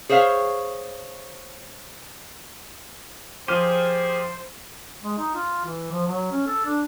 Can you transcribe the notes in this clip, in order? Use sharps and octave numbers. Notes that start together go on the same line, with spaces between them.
G#4 C5 C#5 E5 F5
F3 G4 G#4 C5 F6 D#7
G#3
D#4
F4
E3
F3
F#3
C#4
A4
D4